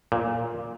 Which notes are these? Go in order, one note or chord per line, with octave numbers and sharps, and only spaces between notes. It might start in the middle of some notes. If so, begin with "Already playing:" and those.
A#2